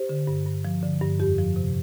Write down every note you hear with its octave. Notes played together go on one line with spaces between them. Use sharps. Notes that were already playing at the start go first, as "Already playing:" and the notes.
Already playing: G4 C5
D3
G2
G2
F3
D3
G2
F2 G4
F3
C3